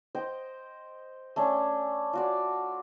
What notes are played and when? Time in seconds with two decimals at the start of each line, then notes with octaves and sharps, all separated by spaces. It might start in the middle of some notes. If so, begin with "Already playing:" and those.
0.15 C5 D#5 G5
1.36 A3 C#4 D4
2.13 F4 F#4 D5